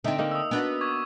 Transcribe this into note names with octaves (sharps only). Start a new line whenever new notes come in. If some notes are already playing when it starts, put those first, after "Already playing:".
D3 C4 D#4 E5
A#3 D#4
D#6 E6
B3 D4 F#4
C#6 D6 G#6